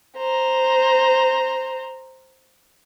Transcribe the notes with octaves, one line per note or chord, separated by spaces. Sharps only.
C5 A#5